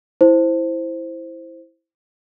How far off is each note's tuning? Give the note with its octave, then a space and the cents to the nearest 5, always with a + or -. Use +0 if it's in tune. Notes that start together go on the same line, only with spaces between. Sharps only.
E4 +0 C5 +0